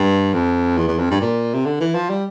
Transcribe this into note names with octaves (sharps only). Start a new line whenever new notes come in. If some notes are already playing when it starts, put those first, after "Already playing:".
Already playing: G2
F2
E2
E2
F2
G2
A#2
C3
D3
E3
F3
G3